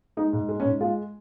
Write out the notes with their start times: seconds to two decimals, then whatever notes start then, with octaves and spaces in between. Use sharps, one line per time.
0.17 G#3 D#4
0.33 G#2
0.49 G#3
0.60 C#4
0.65 G#2
0.80 G#3 F4